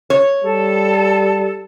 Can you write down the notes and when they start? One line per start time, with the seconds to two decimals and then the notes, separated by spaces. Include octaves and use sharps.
0.10 C#5
0.44 G3 A4